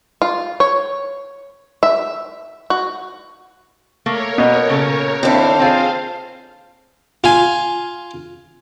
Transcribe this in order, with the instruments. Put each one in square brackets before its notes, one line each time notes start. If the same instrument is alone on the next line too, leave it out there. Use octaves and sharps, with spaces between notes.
[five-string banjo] F4
C#5
E5
F#4
[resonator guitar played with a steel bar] A3 A#3 [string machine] A#4 C#5
[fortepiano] B2
[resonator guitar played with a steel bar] A#2 C#3 A4
[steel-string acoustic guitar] D#2 A4 [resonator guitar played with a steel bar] C4 D4 E4 [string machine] C5 F5
[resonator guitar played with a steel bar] C4 F4 G#4
[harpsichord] F4 F5 G#5